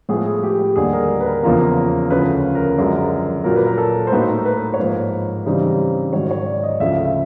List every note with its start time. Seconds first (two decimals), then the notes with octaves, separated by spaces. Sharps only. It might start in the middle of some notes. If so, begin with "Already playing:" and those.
0.09 A2 F3 G#3 B3 G#4
0.26 G#4
0.43 G4
0.59 G4
0.76 D#2 D3 G3 G#4
0.93 A#4
1.20 B4
1.26 A#4
1.43 E2 C#3 F3 A#3
2.10 D2 C#3 F3 B4
2.55 A#4
2.77 F#2 D3 F3 G#3
3.44 A#2 F#3 A#3 A#4
3.56 B4
3.66 A#4
3.78 A4
4.07 C5
4.12 A2 F#3 A#3 D#4 B4
4.45 B4
4.74 C#5
4.79 G#2 F3 A#3 C5
5.46 C#3 E3 G3 C4 D#4
6.13 G#2 D#3 F#3 C#5
6.31 C#5
6.47 D5
6.64 D#5
6.80 D2 C#3 F3 E5
6.93 F5
7.05 E5